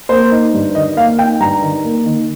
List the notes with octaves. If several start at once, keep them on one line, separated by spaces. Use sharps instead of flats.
A#3 C5
D#4
G2
D#3 D#5
A#3 F5
D#4 G5
G2 A#5
D#3
A#3
D#3